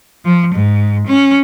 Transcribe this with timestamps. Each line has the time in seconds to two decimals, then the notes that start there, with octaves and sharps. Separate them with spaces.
0.25 F3
0.55 G#2
1.07 C#4